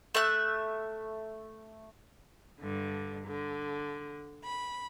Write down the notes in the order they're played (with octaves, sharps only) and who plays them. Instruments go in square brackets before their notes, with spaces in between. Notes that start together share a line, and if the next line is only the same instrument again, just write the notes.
[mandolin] A3 E5 F#6
[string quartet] G2 D3
D3
B5